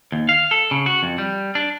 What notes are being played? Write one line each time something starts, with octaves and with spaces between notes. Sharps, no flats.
D#2
F5
A4
C#3
F#4
F2
G3
D4